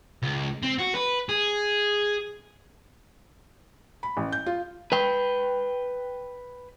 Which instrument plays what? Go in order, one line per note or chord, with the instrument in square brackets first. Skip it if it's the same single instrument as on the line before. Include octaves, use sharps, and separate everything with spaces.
[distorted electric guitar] C#2
C4
F#4
B4
G#4
[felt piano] B5
A1
G6
F4
[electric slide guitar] B4 G5